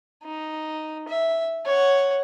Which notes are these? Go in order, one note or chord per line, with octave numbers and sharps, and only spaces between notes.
D#4
E5
C#5 F#5